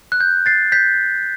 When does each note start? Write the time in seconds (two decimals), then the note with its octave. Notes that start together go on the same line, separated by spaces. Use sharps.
0.12 F#6
0.21 G6
0.46 A6 C7
0.72 G6 B6